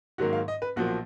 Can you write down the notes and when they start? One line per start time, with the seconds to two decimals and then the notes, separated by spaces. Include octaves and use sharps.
0.18 G#2 D#3 F#3 A#3 F#4
0.33 F5
0.48 D#5
0.62 B4
0.76 B1 A#2 F3 A#3 F#4